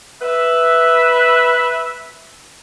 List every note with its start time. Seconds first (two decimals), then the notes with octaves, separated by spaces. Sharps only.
0.22 B4 E5